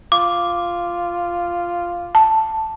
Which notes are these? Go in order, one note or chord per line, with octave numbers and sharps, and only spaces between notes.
F4 D6
A5